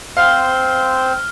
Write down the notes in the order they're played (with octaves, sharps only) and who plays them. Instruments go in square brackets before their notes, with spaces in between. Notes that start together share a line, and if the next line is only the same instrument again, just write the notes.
[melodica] C4 C5 [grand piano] F5 [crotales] F6